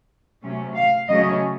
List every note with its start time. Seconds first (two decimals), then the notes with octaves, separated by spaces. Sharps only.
0.42 C3 F#3 A3 C#4
0.74 F5
1.08 C#3 F#3 A3 C#4 D#5